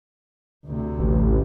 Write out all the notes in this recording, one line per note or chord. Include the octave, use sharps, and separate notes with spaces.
D2 C3
A1